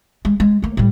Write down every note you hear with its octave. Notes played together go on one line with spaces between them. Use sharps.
G#3
G#3
A3 A#3
A2 G3